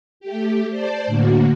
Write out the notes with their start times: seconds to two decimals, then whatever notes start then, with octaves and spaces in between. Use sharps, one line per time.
0.20 A3 G4
0.69 C5 D5 A5
1.06 A2 D3 A#3 F#4